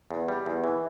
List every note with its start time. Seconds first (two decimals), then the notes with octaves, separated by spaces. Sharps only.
0.11 E2
0.28 G3
0.46 E2
0.64 E3